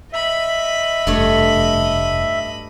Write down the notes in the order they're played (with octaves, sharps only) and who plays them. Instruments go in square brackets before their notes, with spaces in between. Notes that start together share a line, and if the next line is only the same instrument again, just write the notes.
[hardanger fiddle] D#5 B5 [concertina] E5
[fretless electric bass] F1 [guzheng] G2 A3 C#5